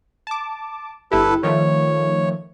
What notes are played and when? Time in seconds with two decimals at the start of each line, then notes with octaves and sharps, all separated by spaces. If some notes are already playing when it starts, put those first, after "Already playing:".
0.27 A5 D6
1.12 G1 E4 G4 A4 B4
1.43 D#3 F3 A3 C#5